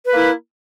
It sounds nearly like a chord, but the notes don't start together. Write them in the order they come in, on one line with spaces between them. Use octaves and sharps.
B4 A#3 E4